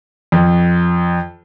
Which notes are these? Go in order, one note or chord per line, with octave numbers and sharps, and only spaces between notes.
F2